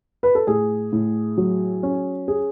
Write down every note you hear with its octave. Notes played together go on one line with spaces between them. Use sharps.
B4
A4
A2 G#4
A2
F#3
C#4
G#4